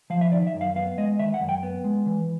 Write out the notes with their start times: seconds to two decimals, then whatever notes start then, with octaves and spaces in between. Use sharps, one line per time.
0.10 F3 F5
0.21 E5
0.32 D#3 D5
0.47 E5
0.54 F#2
0.61 F5
0.76 B3 F5
0.98 G#3 D#5
1.19 D#3 E5
1.34 F#5
1.41 F#2
1.49 G5
1.63 B3
1.84 G#3
2.06 E3